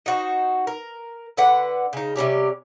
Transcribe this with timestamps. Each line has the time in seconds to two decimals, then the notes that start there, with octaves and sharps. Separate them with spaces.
0.06 D#4 F#4 C5
0.67 A#4
1.37 D3 B4 F#5
1.93 C#3 D#4
2.16 C3 G3 C#4 G4